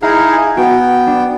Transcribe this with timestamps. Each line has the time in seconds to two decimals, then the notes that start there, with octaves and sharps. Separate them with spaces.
0.02 D#4 E4 G#4 F5 A#5
0.33 G#5
0.57 B3 F#4 G5
1.07 D4